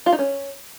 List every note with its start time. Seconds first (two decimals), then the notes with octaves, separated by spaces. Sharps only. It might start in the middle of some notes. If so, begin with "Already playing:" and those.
0.06 F4
0.12 D#4
0.19 C#4